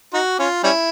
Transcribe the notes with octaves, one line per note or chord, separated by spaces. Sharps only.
D#4 F#4
C#4 F4
G3 C#4 E4